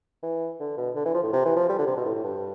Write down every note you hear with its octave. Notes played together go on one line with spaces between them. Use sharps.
E3
D3
B2
D3
E3
F3
A2
C3
E3
F3
G3
D3
C3
B2
A2
A2
G2